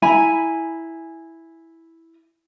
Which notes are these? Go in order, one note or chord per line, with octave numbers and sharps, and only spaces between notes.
E4 G#5 A#5 B5